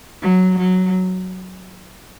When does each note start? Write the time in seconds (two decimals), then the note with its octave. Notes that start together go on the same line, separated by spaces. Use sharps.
0.22 F#3
0.58 F#3